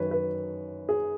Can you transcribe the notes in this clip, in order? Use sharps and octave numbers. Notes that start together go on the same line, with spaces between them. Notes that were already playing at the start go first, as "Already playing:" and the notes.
Already playing: F#2 D#3 B4 C#5
B4
G#4